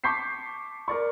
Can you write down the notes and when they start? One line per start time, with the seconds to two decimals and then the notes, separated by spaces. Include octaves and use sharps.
0.04 A5 C#6 D6 G6 B6 C7
0.88 A#4 D5 C#6